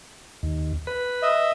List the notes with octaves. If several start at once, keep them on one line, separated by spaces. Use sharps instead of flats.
D#2
B4
D#5 E5